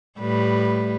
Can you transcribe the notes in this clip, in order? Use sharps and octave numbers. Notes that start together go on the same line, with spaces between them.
A2 G3 B4